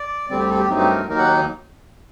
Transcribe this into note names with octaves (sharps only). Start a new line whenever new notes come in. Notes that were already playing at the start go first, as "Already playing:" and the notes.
Already playing: D5
D2 D3 G3 C4 D5
G4
A4
G4
G2 F#3 A3 C4 D#4
G4
A#4
D#2 D#3 F#3 A#3 D#4 A#4
F#5